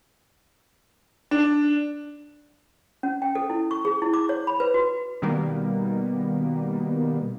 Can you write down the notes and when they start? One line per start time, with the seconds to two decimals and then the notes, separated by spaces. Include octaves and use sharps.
1.31 D4
3.03 C#4
3.22 G5
3.35 A4
3.50 E4
3.71 C#6
3.85 G#4
4.02 E4
4.14 D6
4.29 C#5
4.47 B5
4.60 B4
4.74 F#4
5.22 B2 D#3 G3 A#3 B3